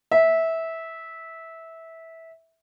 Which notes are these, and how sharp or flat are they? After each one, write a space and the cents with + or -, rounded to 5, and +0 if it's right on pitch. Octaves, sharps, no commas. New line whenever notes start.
E5 -15